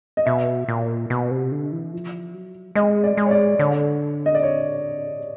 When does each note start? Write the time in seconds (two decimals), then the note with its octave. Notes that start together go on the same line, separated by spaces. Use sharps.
0.17 D#5
0.26 B2 E5
0.68 A#2
1.10 B2
1.31 C3
1.52 D3
1.72 E3
1.93 F3
2.34 F#3
2.75 G#3 D#5
3.04 D5
3.17 G#3
3.26 C#5
3.31 D5
3.59 D3 C#5
4.26 D#5
4.35 D5
4.43 C#5